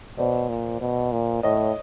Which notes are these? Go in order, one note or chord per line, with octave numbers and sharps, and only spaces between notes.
B2 C5 D5
A#2
B2
A#2
A2 C#5 D#5